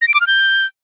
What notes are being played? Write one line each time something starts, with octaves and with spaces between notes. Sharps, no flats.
A#6
D7
D6
F6
G6